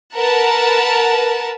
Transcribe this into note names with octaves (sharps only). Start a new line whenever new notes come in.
A#4 B4 F#5 A5 A#5